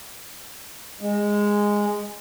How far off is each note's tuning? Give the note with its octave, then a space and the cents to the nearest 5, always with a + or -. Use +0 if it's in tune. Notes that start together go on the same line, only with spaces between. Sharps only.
G#3 -10